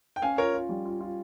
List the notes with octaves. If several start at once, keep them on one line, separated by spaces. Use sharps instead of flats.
G5
C#4 F5 G#5
F4 A#4 C#5
F4
G3
F4
F4